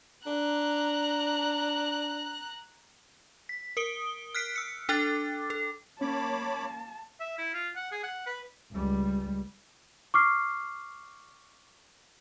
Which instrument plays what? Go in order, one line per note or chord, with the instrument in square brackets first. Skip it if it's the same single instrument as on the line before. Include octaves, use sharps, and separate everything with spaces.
[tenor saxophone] D4 [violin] A#5 F#6
[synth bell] B6
A#4 D#6 D7 G7
F6 F#6 B6 C7 D7
E6 C#7
D4 A4 G5 D6 F#6 A6
A4
[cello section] A#3 [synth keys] C#4 [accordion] C#5 B5 D6 [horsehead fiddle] A5
[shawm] E5
E4
F4
F#5
G#4
F#5
B4
[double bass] C#2 G3
[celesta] C#6 D6 F6 C7